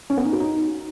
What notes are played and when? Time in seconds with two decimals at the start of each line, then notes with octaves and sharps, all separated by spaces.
0.10 C#4
0.17 B3
0.25 D#4
0.33 F#4
0.40 D#4